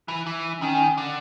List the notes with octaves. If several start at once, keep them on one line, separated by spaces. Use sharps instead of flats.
E3
E3
D#3 C#4
D3